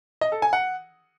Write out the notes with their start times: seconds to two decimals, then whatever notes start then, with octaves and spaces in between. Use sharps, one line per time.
0.21 D#5
0.32 A4
0.42 G#5
0.53 F#5